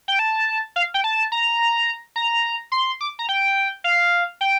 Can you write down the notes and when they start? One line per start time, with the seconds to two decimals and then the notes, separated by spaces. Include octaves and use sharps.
0.08 G5
0.19 A5
0.76 F5
0.94 G5
1.04 A5
1.32 A#5
2.16 A#5
2.72 C6
3.01 D6
3.19 A#5
3.29 G5
3.84 F5
4.41 G5